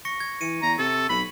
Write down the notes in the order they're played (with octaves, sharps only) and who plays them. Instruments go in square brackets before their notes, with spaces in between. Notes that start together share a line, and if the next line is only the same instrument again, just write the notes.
[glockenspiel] C#6 A#6 C#7
G#6
[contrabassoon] E3 [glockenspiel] C#7 D#7
[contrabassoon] E2 [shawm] A#5
[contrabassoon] C3 [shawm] A4
[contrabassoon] B1 [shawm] B5